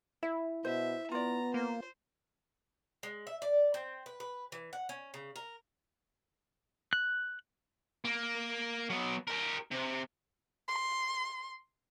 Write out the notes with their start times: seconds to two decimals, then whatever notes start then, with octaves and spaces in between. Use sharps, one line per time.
0.23 E4 E5
0.65 B2 C5 E5
1.11 B3 F4 D5 A#5
1.54 A#3 C5
3.03 G#3
3.27 E5
3.42 D5
3.74 C4
4.06 B4
4.20 B4
4.52 E3
4.73 F#5
4.89 C#4
5.14 C#3
5.36 A#4
6.93 F#6
8.05 A#3
8.90 F#3 B3
9.28 G4 A#4
9.72 C3
10.68 C6